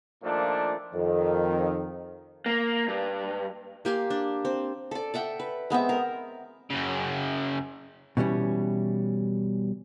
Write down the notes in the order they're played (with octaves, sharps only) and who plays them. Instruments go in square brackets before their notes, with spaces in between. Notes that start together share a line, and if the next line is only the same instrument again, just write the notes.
[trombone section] A#2 D#3 F3 A3 A#3 D4
[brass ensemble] F2 D#3
[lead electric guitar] A#3
G2
[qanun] A#3 G4 G#5 C6
D4
C4
A4 D5
D5 E5 F#5 G5
B4
G#3 B3 C4 E5
A#4
[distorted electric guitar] F#2 C#3
[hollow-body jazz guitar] B2 E3 G3 C#4